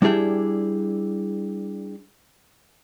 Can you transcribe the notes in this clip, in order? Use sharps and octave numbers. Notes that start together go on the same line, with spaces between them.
G3 D4 E4 G#4 G5